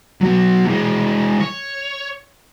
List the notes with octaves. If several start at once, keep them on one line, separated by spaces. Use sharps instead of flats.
F#3 B3
E3 G#3
C#5